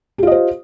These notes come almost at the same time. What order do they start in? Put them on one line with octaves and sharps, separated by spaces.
G4 F4 D#5 C5